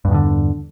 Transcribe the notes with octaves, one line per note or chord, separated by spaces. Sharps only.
E2 G2 B2 D3